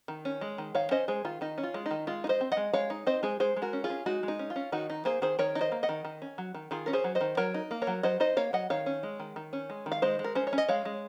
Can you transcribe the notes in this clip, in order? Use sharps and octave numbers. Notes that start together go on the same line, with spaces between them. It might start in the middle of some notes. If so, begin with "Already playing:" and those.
D#3
C#4
G#3
D#3
D#3 C#5 F5
C#4 C5 D#5
G#3 G#4 C5
D#3 F4
D#3 D#4
C#4
F4
G#3
D#4
D#3
G#3 F4
D#4
C5 D#5
C4
D#5 F#5
G#3
G#3 C#5 F5
D#4
C4 C5 D#5
G#3 G#4 C5
G#3 G#4 C5
G#3
F#4 A#4
C#4
F4 G#4
C#4
G#3 D#4 F#4
G#3
D#4
C#4
F4
C#4
D#3 D#4 F#4
D#4
A#3 G#4 C5
D#3 G#4 C5
D#3 A#4 C#5
D#4
C5 D#5
A#3
D#5 F#5
D#3
D#3
C#4
F#3
D#3
D#3 F4 G#4
C#4 A#4
G#4 C5
F#3
C5 D#5
D#3
F#3 A#4 C#5
D#4
A#3
A#4 C#5
F#3
F#3 C5 D#5
D#4 C5 D#5
A#3 C#5 F5
F#3 D#5 F#5
D#3 C#5 F5
C#4
G#3
D#3
D#3
C#4
G#3
D#3
F5
G#3 C5 D#5
G#3
A#4
C#4 C5
C#5
C#4
D#5
G#3 C#5 F5
G#3